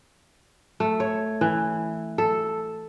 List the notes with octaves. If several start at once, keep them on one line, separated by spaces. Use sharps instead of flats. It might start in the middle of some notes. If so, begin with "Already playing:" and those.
A3
C#5
E3
A4